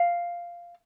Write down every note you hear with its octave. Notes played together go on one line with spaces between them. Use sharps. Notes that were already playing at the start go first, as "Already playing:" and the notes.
Already playing: F5